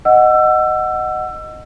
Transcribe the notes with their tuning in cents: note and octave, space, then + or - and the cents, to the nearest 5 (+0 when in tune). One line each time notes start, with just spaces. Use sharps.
D#5 +0 F#5 +0 E6 +25